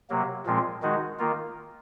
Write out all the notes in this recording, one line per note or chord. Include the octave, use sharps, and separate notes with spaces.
C3 F#3 A#3
A#2 F3 G#3 C4
D#3 G#3 D#4 F#4
D#3 A#3 F4